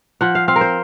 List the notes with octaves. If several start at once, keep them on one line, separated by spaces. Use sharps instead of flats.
F3 F#5
F5
C4 F5
A#4
C5